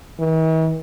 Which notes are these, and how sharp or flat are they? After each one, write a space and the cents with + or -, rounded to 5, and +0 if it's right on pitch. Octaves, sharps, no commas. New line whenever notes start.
E3 -45